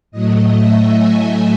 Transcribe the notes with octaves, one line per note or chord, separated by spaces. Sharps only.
A2 F#3 A3 D#5
E5
G#5